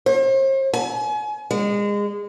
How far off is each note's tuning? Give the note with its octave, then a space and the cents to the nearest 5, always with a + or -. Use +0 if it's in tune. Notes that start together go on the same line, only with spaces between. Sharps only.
C5 +45
G#5 +35
G#3 -25